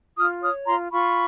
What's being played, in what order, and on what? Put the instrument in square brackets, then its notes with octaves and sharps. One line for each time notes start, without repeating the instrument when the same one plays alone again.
[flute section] F4 D#6 F6
C#5 D#6 F6
F4 A#5 C6
F4 B5 C#6